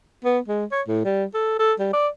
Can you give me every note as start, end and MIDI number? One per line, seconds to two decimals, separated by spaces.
0.25 0.39 59
0.48 0.65 56
0.72 0.82 73
0.88 1.03 45
1.05 1.25 55
1.34 1.57 69
1.59 1.73 69
1.80 1.89 55
1.93 2.08 74